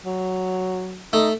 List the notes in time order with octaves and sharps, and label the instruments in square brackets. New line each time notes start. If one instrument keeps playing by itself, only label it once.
[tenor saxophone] F#3
[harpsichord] A3 [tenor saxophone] D#4